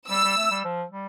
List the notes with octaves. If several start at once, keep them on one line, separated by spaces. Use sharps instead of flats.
G3 E6
G3
A3
G3
F3
G3